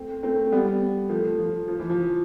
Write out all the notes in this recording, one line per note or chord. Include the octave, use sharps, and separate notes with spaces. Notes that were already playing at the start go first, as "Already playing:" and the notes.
Already playing: A3 C4
A3 C4
A3
G3 B3
F3 A3
F3
F3
E3
F3